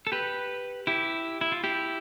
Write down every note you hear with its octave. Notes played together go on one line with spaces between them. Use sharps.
A4
G4 B4
E4 G4
E4
F4
E4 G4